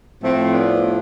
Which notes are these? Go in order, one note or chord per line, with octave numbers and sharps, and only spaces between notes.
A2 F3 A3 C4
B3 D4